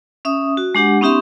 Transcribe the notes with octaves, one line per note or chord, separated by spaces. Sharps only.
C#4 E5 D#6
F#4
G#3 D4 G4 F#5
B3 C#4 D#4 G4 E5 C6